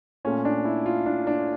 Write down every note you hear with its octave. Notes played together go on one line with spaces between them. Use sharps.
A#2 A3 C#4
D4
E4
F4
D4
D4